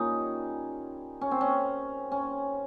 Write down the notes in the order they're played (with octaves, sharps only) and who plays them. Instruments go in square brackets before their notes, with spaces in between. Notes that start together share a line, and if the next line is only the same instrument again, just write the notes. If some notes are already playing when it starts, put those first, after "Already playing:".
Already playing: [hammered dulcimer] A#2 G3 C#4 D#4
C#4
C4
C#4
C#4